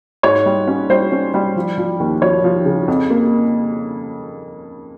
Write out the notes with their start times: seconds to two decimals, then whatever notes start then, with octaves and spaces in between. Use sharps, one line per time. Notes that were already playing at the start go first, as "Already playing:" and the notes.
0.23 G#2 C#5
0.46 G3
0.67 C#4
0.89 G3 C5
1.12 C#4
1.34 G3
1.56 F3
1.78 F3
2.00 D#2
2.22 F3 C#5
2.44 F3
2.66 C#3
2.88 F2
3.10 A#3